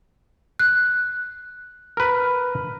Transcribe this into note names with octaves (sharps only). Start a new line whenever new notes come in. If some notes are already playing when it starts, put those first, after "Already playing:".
F#6
A#4 B4